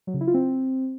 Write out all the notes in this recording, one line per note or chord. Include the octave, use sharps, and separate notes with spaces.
F#3
C#3
E4
F4
C4